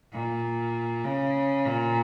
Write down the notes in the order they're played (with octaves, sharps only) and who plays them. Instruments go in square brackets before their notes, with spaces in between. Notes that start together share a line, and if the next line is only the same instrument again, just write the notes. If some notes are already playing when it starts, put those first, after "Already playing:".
[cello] A#2
C#3
A#2